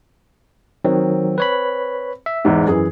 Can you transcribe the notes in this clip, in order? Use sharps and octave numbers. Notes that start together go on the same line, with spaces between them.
D#3 F#3 C4
B4 C#5 B5
E5
E2 G#2
F#2 E3 G#4